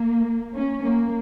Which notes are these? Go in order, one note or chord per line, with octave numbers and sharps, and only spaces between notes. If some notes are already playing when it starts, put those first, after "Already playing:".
Already playing: A#3
C#4
A#3